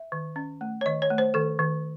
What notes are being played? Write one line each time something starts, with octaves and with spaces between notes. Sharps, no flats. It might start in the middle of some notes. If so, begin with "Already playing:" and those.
Already playing: E5
D#3
C#4
A3
C#5
D#3 D#5
C#5
A3
C5
D#3 A4
D#3